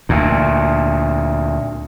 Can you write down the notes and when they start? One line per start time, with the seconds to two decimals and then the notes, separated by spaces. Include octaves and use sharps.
0.09 D2 A#2